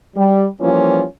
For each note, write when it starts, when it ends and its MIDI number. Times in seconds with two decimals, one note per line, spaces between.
0.15 0.46 55
0.61 1.03 52
0.61 1.03 53
0.61 1.03 55
0.61 1.03 58
0.61 1.03 61
0.61 1.03 65